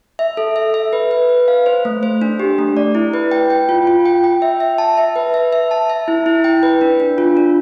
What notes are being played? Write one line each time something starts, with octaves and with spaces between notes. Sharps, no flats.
E5
A4
E5
E5
B4
B4
B4
F5
C5
A3
C5
D4
G4
A3
D5
E4
B4
G5
G5
F4
F4
G5
G5
E5
E5
A5
E5
B4
E5
E5
A5
E5
E4
E4
G5
B4
D4
D4
F4
D4